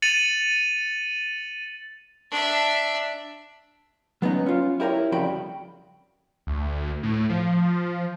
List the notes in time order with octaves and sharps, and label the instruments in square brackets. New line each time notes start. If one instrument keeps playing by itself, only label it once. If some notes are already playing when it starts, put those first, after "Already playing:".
[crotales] A6 C#7 D#7 F7 F#7
[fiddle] D4 E5
[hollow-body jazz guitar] F#3 B3 C#4 D#4
C#4 F4
E4 G4 A#4 B4 C#5
F2 C#3 G3 F#4 G5 B5
[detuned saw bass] D2
A2
F3